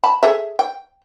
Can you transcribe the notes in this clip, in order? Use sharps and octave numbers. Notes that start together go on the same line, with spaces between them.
A5 B5
G#4 A4 E5
G5